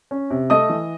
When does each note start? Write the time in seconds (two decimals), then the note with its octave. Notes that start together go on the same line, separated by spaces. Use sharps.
0.11 C#4
0.30 C3
0.50 A3 D#5 D#6
0.69 E3